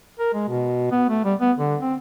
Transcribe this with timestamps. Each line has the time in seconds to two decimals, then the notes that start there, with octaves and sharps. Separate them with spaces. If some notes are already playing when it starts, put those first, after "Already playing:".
0.20 A#4
0.34 G#3
0.48 B2
0.91 B3
1.09 A3
1.24 G3
1.40 B3
1.58 D3
1.81 C4